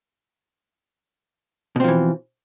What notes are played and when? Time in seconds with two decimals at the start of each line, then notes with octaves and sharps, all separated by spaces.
1.76 B2
1.80 C4
1.84 F3
1.88 E3